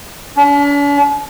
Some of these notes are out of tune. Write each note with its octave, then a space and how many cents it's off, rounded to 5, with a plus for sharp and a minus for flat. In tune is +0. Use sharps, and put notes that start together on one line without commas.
D4 -45